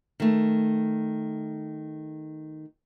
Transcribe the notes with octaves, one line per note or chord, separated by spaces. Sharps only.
D#3 A3